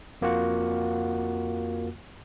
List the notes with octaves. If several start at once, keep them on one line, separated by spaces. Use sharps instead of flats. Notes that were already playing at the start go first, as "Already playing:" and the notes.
F2 A#3 F4 F#4 F#5